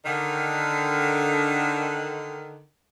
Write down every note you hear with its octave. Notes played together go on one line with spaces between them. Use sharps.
D3 D#3